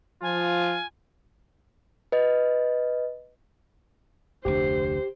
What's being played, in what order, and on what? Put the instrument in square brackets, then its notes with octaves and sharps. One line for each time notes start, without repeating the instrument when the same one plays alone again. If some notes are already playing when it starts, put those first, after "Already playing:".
[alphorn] F3 [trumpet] F4 [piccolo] G#5
[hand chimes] B4 D#5
[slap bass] F1 D2 D4 [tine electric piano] G4 [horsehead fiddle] C5